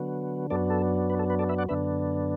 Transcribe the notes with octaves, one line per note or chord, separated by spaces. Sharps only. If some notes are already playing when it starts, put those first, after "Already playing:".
Already playing: D3 F#3 B3
F#2 F#3 B3 D4 A4 D5
A4
B4
A4
B4
A4 D5
B4 E5
D5 F#5
F#2 D3 B3 D4 B4 E5